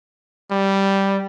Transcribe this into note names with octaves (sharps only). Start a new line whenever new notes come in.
G3